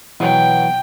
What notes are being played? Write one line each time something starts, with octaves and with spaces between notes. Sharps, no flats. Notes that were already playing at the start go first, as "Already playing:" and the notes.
B2 E3 F#3 G5